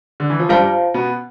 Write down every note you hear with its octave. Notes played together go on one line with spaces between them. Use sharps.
D3
E3
F3
G2 G3 F4 C5 F5 A5
B2 B3